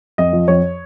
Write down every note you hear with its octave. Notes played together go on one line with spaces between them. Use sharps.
F2 D#5
F3
F2 C#5